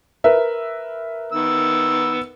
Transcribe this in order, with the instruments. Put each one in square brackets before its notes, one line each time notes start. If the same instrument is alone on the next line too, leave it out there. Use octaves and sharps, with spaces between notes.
[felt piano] A#4 B4 E5
[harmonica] D#3 B3 E6